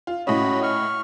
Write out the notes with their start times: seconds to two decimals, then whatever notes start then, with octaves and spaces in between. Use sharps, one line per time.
0.07 F4
0.27 A2 C#4 F#4 D#5 B5
0.63 C#6 F6